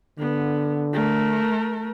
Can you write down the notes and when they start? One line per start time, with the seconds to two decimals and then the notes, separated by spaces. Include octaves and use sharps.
0.19 D3 B3
0.93 A3 A#4